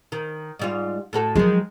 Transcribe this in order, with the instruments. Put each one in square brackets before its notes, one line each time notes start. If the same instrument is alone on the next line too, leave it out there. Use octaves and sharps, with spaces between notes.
[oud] D#3
G#2 G3 F4
A2 F#4 A4
[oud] D#3 G#3 [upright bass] F3 F#3